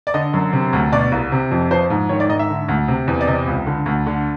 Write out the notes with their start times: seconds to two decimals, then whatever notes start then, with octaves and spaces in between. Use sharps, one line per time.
0.07 D5
0.14 D3 D#5
0.34 F#2
0.53 C3
0.73 D2
0.92 B2 D5
1.12 C2
1.32 C3
1.51 F2
1.71 F3 C5
1.90 G#2
2.09 D#3 C#5
2.20 D5
2.29 G#2 D#5
2.39 E5
2.50 D3
2.68 D2
2.88 C3
3.08 E2
3.21 D5
3.27 C3 D#5
3.47 C#2
3.67 D3
3.86 D2
4.06 D3